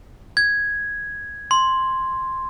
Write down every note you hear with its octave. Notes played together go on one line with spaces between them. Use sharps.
G#6
C6